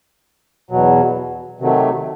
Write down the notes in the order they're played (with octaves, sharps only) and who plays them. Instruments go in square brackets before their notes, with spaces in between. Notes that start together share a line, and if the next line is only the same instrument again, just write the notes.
[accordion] E2 B2 F#3
C3 D#3 F#3 A3